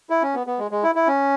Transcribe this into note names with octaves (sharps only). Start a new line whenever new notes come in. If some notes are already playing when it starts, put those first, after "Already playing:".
E4
C#4
B3
B3
G#3
G#3
E4
E4
C#4